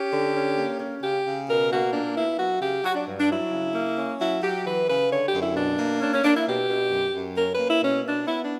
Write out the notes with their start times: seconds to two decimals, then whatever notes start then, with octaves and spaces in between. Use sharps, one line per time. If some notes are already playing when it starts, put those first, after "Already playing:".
Already playing: C#4 G4
0.12 D3
0.35 C#4
0.57 A#3
0.80 C#4
1.02 C#3 G4
1.26 C#3
1.47 B2 A#4
1.71 A#3 F#4
1.93 A#2 D4
2.16 B3 E4
2.38 F#3 F#4
2.61 C#3 G4
2.84 F#3 F#4
2.95 D4
3.07 G2
3.18 D4
3.29 F#3 E4
3.52 C#3
3.74 A#3
3.97 C#4
4.20 F#3 E4
4.42 F#3 G4
4.64 E3 B4
4.87 C#3 B4
5.10 D3 C#5
5.25 G4
5.33 F#2
5.40 E4
5.56 B2 D4
5.79 A#3
6.01 C#4 D4
6.13 C#4
6.24 A#3 D4
6.34 E4
6.46 B2 G4
6.68 B2
6.91 F#2
7.14 F#2
7.37 C#4 A#4
7.52 B4
7.59 A#3
7.67 E4
7.81 B2 C#4
8.04 B2 D4
8.27 B3 E4
8.42 D4